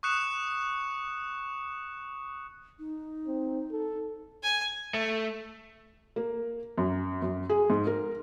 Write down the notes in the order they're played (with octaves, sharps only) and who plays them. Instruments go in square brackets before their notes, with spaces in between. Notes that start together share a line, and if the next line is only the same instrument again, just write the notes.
[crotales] C#6 D#6 F#6 C#7 E7
[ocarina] D#4
[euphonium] C4
A4
[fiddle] G#5
[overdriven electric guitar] A3
[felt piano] A#3
F#2
F#2
G#4
G#2
A#4